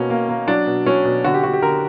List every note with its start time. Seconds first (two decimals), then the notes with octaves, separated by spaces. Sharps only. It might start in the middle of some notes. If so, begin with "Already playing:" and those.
Already playing: B2 A#3 C#4
0.10 A#3
0.29 A#3
0.48 F#3 D4
0.67 B2
0.86 F#3 C#4
1.05 B2
1.24 D3 F#4
1.34 G4
1.43 D3 F#4
1.53 G4
1.62 D3 A#4